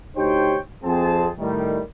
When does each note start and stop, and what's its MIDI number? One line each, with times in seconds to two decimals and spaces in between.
0.17 0.58 38
0.17 0.58 63
0.17 0.58 67
0.17 0.58 72
0.17 0.58 73
0.17 0.58 79
0.84 1.30 41
0.84 1.30 60
0.84 1.30 68
0.84 1.30 81
1.39 1.81 45
1.39 1.81 51
1.39 1.81 55